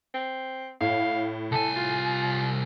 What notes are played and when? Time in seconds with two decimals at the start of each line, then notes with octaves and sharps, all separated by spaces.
0.14 C4
0.81 A2 F5
1.52 C2 A4 G#5
1.76 F4